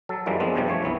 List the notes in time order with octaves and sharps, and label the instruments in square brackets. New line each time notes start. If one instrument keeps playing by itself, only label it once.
[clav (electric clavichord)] F#3 A4
F#2 E3 F3 G3 G#3 A#3
F3 G#3 B3 C4 D4
E2 G2 C3 F3 G3
G2 F3 A3 C#5
C2 E3 B3 E4